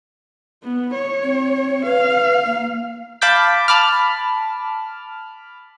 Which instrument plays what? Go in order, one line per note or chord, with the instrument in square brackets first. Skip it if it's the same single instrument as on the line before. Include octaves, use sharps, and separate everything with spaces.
[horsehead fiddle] B3
C#5
[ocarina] C4
[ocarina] B4 [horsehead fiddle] F5
[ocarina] A#3
[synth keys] F5 A5 B5 D6 G6 B6
A5 B5 D6 F6